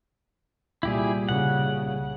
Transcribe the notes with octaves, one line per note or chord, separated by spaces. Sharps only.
C2 A#2 G3 E4 G4 G#4
C#3 F#5